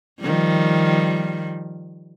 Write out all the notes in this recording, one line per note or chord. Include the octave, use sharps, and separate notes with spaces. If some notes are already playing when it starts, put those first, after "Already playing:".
D#3 F3 G3